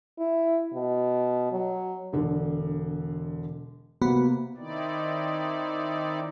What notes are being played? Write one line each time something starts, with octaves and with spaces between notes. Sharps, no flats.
E4
B2
F#3
E1 D3
C3 A#3 B3 F#4 B5
D#3 C4 D#4 E4 D5